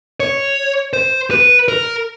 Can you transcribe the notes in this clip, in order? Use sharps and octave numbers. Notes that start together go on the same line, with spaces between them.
C#5
C5
B4
A#4